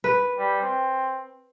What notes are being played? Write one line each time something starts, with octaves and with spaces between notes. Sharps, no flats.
B4
G3
C4